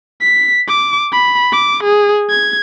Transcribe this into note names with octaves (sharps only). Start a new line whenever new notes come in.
B6
D6
B5
D6
G#4
G#6